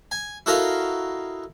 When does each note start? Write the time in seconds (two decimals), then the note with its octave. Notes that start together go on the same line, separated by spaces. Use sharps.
0.11 G#5
0.46 E4 F#4 A4 A#4 D#5 F5